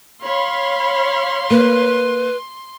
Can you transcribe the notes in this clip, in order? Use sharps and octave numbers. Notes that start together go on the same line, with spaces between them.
C#5 F5 B5 C6
A#3 B4